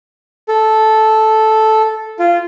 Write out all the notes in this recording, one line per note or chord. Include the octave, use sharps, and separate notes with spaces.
A4
F4